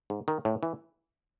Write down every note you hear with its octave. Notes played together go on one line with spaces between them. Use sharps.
G#2
D#3
A2
E3